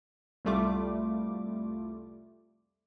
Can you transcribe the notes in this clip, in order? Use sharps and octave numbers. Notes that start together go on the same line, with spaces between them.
C2 F2 G3 A3 F4 D6